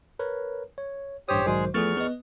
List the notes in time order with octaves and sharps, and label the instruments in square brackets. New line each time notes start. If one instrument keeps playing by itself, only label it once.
[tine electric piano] A#4 B4 C#5
C#5
[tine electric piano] A1 G2 D#6 [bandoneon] G4 C5 C#5
[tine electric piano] B1 D#3 C5 [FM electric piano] G#2 F#3 D5 [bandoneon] G#3 G#4
[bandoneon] E2 C#6 F6 [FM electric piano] F3 A3 B3 [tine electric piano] G#4 A6
[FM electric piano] B3 D#5